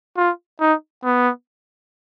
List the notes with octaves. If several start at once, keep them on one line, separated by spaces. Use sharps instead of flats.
F4
D#4
B3